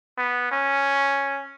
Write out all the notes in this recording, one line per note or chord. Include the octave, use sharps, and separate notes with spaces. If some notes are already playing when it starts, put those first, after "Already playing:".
B3
C#4